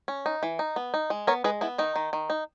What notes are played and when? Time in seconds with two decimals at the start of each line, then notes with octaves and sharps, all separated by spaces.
0.08 C#4
0.26 D#4
0.43 E3
0.59 D#4
0.76 B3
0.94 D#4
1.10 G#3
1.27 B3 A#4 C#5
1.44 G#3 G#4 B4
1.61 B3 E4
1.78 D#3 D#4
1.96 D#3
2.13 D#3
2.30 D#4